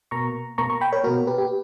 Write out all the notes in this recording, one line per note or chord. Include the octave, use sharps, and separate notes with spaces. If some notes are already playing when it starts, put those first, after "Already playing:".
B2 A#3 A#5 C#6
B2 A#3 A#5 C#6
A#5 C#6
G5 B5
A#4 C#5
B2 A#3 F#4 A#4
G4 B4
G4